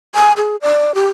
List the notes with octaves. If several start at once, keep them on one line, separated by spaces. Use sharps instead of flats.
G#5
G#4
D5
G4